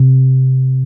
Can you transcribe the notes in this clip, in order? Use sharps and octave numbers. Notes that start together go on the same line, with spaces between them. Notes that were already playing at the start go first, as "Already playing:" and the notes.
Already playing: C3